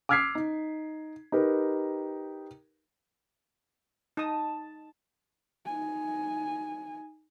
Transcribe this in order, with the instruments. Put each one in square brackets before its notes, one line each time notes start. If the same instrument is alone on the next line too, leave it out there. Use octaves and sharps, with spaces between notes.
[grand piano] D6 E6 F6 G#6 B6 C7
D#4
D#4 G4 A#4 B4
[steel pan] D#4 D#6 [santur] A5
[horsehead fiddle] D#4 G#5